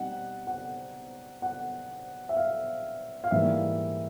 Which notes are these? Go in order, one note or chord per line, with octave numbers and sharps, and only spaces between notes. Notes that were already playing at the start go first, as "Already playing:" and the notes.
Already playing: B2 G3 C4 D#4 F#5
F#5
F#5
E5
F5
F5
G#2 E3 G3 A#3 D#4 E5